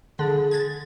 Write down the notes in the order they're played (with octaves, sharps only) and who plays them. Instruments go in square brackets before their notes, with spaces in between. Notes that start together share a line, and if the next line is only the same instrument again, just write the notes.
[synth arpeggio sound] D3 [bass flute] G#4
[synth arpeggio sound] G#6 A6